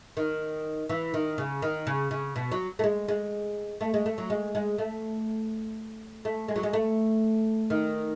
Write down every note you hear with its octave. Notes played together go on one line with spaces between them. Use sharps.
D#3
E3
D#3
C#3
D#3
C#3
C#3
B2
F#3
A3
G#3
G#3
A3
G#3
A3
F#3
G#3
G#3
A3
A3
G#3
F#3
G#3
A3
D#3